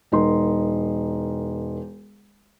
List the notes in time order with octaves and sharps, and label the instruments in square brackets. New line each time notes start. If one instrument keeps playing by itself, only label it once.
[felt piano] E1 D#4 A#4 C6